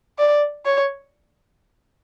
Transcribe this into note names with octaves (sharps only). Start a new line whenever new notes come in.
D5
C#5